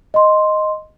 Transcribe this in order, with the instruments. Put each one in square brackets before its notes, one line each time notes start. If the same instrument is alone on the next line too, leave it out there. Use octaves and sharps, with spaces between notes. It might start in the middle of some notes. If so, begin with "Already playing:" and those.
[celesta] D#5 C6